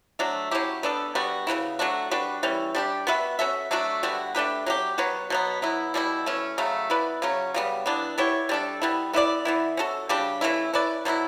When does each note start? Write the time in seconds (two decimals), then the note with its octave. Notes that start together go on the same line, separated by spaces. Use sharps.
0.19 F#3 A3 D4
0.51 F#3 C#4 E4 G4
0.83 B3 D4 A4
1.15 G3 B3 D4 F#4
1.47 C#3 F#3 B3 E4
1.79 F#3 A3 D4 F#4
2.11 G3 D4 F#4 B4
2.43 E3 G3 C#4
2.75 G3 D4 G4
3.07 B3 F#4 B4 E5
3.39 C#4 F#4 A4 E5
3.71 F#3 A3 D4 F#4
4.03 D3 G3 B3 F#4
4.35 A3 D4 G4 B4
4.66 F#3 C#4 G4
4.98 F#3 B3 F#4 C#5
5.30 B2 F#3 B3
5.62 F#3 B3 E4
5.94 B2 G3 C#4 E4
6.26 E3 A3 C#4
6.58 C#3 F#3 A3
6.90 B3 E4 B4 D5
7.22 C#3 F#3 C#4
7.54 C#3 G3 B3
7.86 E3 B3 D4
8.18 B3 E4 G4 C#5
8.49 G3 D4 A4
8.82 G3 B3 E4
9.13 B3 E4 G4 D5
9.45 E3 B3 E4
9.77 C#4 F#4 A4
10.09 C#3 G3 D4 G4
10.41 E3 A3 C#4 E4
10.73 C#4 E4 B4 D5
11.05 B2 F#3 B3 E4